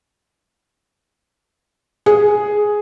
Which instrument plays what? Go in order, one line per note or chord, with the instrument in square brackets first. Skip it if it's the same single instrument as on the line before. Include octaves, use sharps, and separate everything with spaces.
[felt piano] G#4